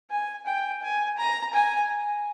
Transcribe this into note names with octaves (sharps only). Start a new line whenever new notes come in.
G#5
G5
G#5
A#5
G#5